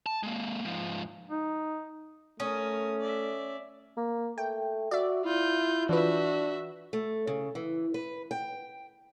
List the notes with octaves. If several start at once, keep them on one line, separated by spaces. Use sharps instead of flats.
A5
G#3 A#3
G#2 F3
D#4
A3 C#4 A#4 D#6
D5 E5
A#3
A3 G5
F#4 D5 E5
E4 F4 G6
E3 D4 F4 F#4 B4 E5
A3
C#3
E3
B4
G5